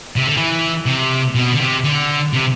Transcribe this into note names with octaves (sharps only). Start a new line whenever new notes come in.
C3
D3
E3
C3
B2
D3
C3
D3
C3